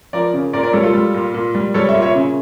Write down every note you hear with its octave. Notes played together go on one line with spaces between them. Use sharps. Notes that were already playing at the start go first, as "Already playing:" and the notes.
F3 A#4 D5
C#3
A#2 A#4 D5
A#4 D5
G3 A4 C#5
F4 A4
G3
A#2
A#2
G3
G3 A4 C#5
C#5 E5
A#2
C#5 E5
C#3